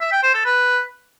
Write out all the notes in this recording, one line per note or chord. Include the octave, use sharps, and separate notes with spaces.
E5
G5
C5
A4
B4